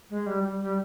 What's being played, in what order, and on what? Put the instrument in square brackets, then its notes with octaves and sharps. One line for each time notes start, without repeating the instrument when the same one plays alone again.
[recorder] G#3
G3
G3
G3